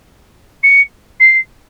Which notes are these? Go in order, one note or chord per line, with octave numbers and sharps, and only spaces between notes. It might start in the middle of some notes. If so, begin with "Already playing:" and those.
C#7
C7